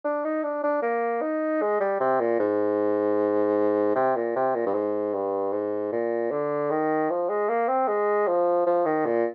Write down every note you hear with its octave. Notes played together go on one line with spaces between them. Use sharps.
D4
D#4
D4
D4
A#3
D#4
G#3
G3
C3
A#2
G#2
C3
A#2
C3
A#2
G2
G#2
G2
G#2
A#2
D3
D#3
F3
G#3
A#3
C4
G#3
F3
F3
D#3
A#2